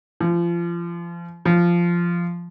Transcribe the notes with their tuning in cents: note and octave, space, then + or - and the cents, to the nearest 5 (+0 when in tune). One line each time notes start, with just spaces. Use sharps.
F3 -30
F3 -10